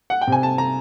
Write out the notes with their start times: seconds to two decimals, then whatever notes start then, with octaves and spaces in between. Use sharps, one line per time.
0.10 F#5
0.21 G5
0.27 C3 G#5
0.43 A5
0.58 A#5